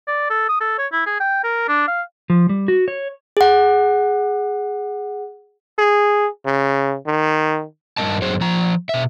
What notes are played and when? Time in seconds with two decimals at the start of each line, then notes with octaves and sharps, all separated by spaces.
0.07 D5
0.30 A4
0.49 D#6
0.61 A4
0.78 C#5
0.92 E4
1.06 G#4
1.20 G5
1.44 A#4
1.68 D4
1.88 F5
2.30 F3
2.49 G3
2.68 F#4
2.88 C#5
3.37 G#4 F#5
5.79 G#4
6.46 C#3
7.07 D#3
7.97 G2 B3 A#4 D#5 A5
8.22 F#2 F#3 G#4 C5
8.41 F3 A#5
8.89 B2 E5